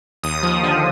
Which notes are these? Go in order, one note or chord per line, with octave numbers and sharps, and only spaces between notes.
D#2 D#6
F3
D3